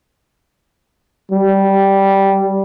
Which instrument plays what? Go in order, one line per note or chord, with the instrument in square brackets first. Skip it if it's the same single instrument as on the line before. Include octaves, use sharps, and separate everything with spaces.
[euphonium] G3